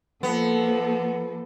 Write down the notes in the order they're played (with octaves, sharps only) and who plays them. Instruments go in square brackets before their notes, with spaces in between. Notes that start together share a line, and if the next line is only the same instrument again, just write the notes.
[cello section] F3 A#3 A4 [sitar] B3